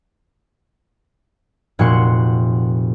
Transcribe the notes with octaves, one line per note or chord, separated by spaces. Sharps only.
F1 A#2 F#4 F#5 C6 C#6